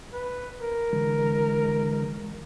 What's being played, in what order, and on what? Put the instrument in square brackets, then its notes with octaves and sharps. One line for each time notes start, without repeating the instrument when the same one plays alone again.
[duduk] B4
A#4
[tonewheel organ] D3 E3 G#3